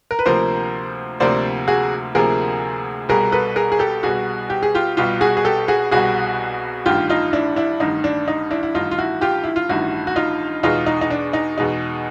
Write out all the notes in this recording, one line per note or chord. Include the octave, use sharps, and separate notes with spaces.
A#4
B4
D2 C3 F3 A#3 A#4 C5
D2 C3 F3 A#3 C5 D5
F#4 G#4
D2 C3 F3 A#3 G#4 A#4
C2 B2 G3 G#4 A#4
A4 B4
G#4 A#4
G#4
G4 A4
C2 B2 G3 F#4 G#4
G4
G#4
F4 G4
C2 B2 G3 F4 G4
F#4 G#4
G#4
G4 A4
F#4 G#4
C2 B2 G3 F#4 G#4
A1 G2 D#3 F4 G4
D#4 F4
D4 E4
D4 E4
A1 G2 D#3 D#4
D4
D#4
D4 E4
E4
A1 G2 D#3 D#4 F4
F4
E4 F#4
F4 G4
E4
F4
A1 G2 D#3 E4 F#4
F#4
D#4 F4
E2 B2 G#3 D#4 F4
D#4
D#4
D4
D#4
E2 B2 G#3 D#4